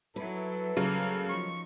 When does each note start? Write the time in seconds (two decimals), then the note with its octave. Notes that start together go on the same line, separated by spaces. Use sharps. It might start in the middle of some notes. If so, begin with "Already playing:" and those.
0.16 F#3 E4 A4 B4
0.77 C#3 F#3 A#3 A#4
1.29 F3 D#4 C#6